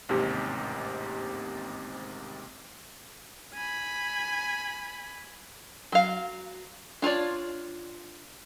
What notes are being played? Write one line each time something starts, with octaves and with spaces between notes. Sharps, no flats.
A1 D#2 G#2 C3 G4
G#5 B5
F#3 F5
D4 F4 C#5 D5